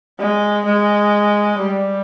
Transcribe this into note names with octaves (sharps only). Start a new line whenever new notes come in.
G#3
G#3
G3